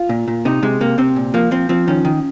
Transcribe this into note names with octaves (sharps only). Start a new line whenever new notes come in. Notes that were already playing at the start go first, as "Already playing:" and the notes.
Already playing: F4
A#2
A#2
C3 D#4
C3 G#3
C3 A#3
C3 C4
A#2
F3 A#3
F3 C4
F3 C4
D#3 C#4
D#3